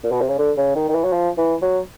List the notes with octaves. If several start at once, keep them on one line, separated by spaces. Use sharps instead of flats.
A#2
B2
C3
C#3
D3
C#3
D#3
D#3
E3
F#3
F3
E3
F#3